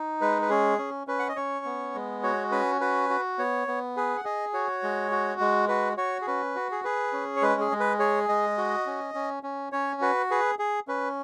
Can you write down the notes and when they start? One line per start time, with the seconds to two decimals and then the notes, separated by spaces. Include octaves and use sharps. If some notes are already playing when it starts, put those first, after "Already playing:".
Already playing: D#4
0.21 G#3 B4
0.42 B4
0.50 C#4 G#4
0.78 C#4
1.07 C#4 B4
1.19 F#5
1.29 D#5
1.36 C#4 C#5
1.65 B3
1.95 G#3
2.23 F#4 C#5
2.51 C#4 B4
2.81 F#4 B4
3.10 F#4
3.38 B3 C#5
3.68 B3
3.97 G#4 B4
4.17 F#5
4.25 G#4 D#5
4.53 F#4 C#5
4.83 G#3
5.11 F#4
5.40 G#3
5.68 F#4 B4
5.97 F#4 C#5
6.21 G#4
6.27 C#4 B4
6.55 F#4
6.71 G#4
6.84 G#4 B4
7.13 C#4
7.36 C#5
7.42 G#3 B4
7.61 G#4
7.71 G#3
7.80 B4
7.99 G#4 C#5
8.29 G#3 D#5
8.58 F#4
8.86 C#4
9.14 C#4
9.43 C#4
9.72 C#4 C#5
10.01 F#4 B4
10.31 G#4 B4
10.59 G#4
10.88 C#4 B4